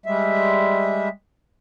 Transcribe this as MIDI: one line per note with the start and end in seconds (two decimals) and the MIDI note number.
0.06 1.09 55
0.06 1.09 56
0.06 1.09 76